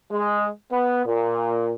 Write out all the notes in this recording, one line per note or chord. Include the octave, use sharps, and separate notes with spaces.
G#3
B3
A#2